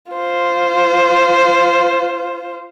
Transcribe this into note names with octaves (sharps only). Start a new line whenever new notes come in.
F4 C5